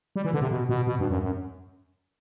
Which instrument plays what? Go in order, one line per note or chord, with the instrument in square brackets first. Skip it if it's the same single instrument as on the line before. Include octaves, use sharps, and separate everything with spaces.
[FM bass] G3
E3
D3
C3
B2
B2
B2
G2
F#2
F#2